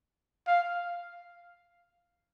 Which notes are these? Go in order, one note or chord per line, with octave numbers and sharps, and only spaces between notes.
F5